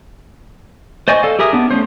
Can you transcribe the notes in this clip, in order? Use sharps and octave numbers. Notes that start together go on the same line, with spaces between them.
C5 D5 D#5 G#5 C#6
A4 F5
G4 G#4 A#4 E5 D#6
B3 D4
A3 C#4 C5